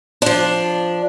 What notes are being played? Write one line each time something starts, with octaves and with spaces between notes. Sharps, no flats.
F3 D4